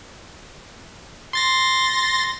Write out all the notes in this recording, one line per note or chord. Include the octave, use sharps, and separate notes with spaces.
C6 A6 A#6